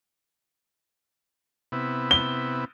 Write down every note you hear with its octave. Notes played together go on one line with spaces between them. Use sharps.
C3 B3 E4
G7